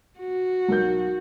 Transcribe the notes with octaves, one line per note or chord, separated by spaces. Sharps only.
F#4
B1 A#4 G6